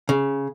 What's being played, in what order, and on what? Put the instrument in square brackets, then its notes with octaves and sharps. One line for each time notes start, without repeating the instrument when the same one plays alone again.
[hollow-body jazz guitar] C#3